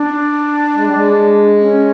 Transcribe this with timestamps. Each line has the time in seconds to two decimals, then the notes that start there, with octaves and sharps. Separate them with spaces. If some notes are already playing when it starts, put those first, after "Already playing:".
Already playing: D4
0.75 G#3
0.85 G3
0.94 G#3
1.60 C#4